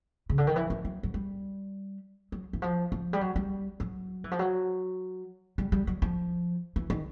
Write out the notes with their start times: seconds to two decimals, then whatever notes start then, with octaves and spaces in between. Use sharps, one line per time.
0.30 C#3
0.38 D3
0.47 D#3
0.56 E3
0.70 F3
0.85 F#3
1.03 F#3
1.14 G3
2.32 F#3
2.53 E3
2.62 F3
2.92 F3
3.13 G3
3.21 F#3
3.36 G3
3.80 F#3
4.24 E3
4.31 F3
4.39 F#3
5.58 G3
5.72 G3
5.87 F#3
6.02 F3
6.76 E3
6.90 D#3